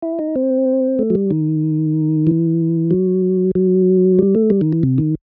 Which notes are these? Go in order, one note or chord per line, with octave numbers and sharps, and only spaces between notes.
E4
D#4
C4
A3
F#3
G3
D#3
E3
F#3
F#3
G3
A3
G3
D#3
E3
C3
D#3